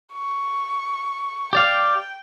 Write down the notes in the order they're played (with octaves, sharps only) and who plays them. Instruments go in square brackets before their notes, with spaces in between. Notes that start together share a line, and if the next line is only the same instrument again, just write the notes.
[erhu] C#6
[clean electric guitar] G4 D5 F5 [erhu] G5